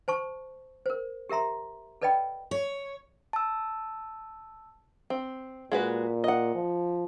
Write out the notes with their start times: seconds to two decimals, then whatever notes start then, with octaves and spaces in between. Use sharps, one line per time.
0.08 C5 A5 C#6
0.86 A#4 C5
1.29 G4 A#4 E5 A#5 C6
2.02 A4 B4 D5 D#5 G5 B5
2.51 C#5
3.33 A5 E6
5.10 C4
5.72 A#2 G#3 F#4 B4
6.24 D#5 F#5
6.55 F3